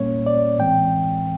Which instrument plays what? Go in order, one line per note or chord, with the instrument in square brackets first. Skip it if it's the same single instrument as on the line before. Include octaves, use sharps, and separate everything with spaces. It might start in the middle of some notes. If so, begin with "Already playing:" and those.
Already playing: [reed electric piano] A#2 G3 A#3 C#4 C#5
D5
A2 E3 G#3 C4 G5